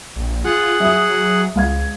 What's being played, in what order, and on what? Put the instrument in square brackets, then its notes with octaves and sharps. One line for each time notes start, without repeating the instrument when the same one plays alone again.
[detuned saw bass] A#1
[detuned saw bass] F4 [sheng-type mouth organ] G#4 F#5
[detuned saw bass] F#3 [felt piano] E5 D#6
[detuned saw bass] C#2 [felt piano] G#3 F5 G#6